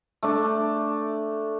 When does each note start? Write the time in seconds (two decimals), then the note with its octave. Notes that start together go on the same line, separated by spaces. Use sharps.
0.23 A3 D4